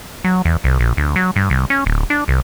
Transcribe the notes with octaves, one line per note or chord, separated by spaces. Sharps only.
F#3
E2
C2
A#1
D2
F#3
G2
C2
C#4
D1
D4
C2